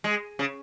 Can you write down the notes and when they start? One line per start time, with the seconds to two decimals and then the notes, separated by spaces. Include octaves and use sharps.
0.04 G#3
0.39 C#3